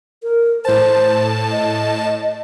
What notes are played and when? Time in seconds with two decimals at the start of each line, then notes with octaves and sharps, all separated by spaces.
0.23 A#4
0.65 A2 C5 A5
1.52 D#5